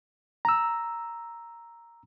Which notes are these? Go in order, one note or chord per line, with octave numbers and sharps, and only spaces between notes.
A#5 E6